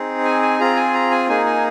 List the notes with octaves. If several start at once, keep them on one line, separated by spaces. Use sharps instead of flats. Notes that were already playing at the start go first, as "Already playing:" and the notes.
Already playing: C4 D#4 G#4
G#5
G#5
C4 F4 G#4 A#5
G#5
A#5
G#5
A#3 D#4 G#4 G#5
G#5